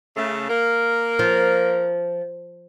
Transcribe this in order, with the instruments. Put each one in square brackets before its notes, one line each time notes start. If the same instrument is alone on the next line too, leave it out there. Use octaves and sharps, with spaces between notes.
[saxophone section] C#3 A3
A#3 A#4
[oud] F3